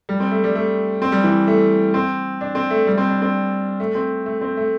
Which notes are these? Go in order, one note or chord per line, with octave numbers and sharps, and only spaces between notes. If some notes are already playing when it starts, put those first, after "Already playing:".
G3
C4
A3
G3
A3
C4
G3
E3
A3
C4
D4
C4
A3
G3
C4
D4
C4
A3
C4
A3
C4
A3